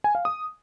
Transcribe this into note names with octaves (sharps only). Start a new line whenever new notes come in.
G#5
F5
D#6